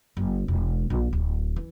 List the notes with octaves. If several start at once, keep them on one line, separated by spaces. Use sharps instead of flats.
F#1
E1
A#1
D1
E3